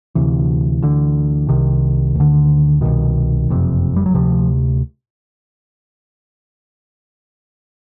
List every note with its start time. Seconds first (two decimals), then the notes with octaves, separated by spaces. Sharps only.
0.15 D2 C3 E3
0.82 D2 D3
1.49 C2 C3 D#3
2.15 D2 D3
2.81 C2 B2 D#3
3.49 F#1 F2 C3
3.96 G3
4.06 F#3
4.14 D2 C3 F3